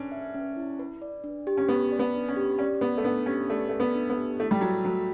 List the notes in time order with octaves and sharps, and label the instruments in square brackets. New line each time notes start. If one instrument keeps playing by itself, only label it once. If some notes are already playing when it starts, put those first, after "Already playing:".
Already playing: [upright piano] C#4 D4 [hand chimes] B4
[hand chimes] E5
C#4
E4
B4
D5
D4
G4
[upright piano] C#4
[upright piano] B3 [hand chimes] B4
[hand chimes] D5
[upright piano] B3
[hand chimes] D4
[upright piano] C#4
[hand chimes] G4
[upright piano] C#4 [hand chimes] D5
[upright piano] B3 [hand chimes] F#5
[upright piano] A3
[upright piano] B3 [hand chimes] D4
[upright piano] C#4 [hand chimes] G4
[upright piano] A3 [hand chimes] D5
[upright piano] A3 [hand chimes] F#5
[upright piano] B3
[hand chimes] D4
[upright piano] B3
[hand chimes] G4
[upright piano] A3 [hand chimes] E4
[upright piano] G3
[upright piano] F#3 [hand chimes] A4
[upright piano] F#3 [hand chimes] A3